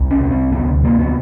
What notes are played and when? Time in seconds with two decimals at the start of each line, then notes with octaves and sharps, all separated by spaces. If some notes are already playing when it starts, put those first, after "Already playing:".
Already playing: C2
0.11 C#4
0.20 C3
0.31 C4
0.51 D2 B3
0.84 C3 A#3
0.99 B3